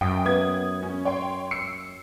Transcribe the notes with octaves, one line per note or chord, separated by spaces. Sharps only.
F#2 G5 D#6
B3 D#6 G#6
C#4
C#5 G5 C6
E6 C7 C#7